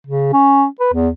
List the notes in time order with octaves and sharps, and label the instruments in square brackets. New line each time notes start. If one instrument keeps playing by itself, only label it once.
[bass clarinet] C#3
C#4
B4
E2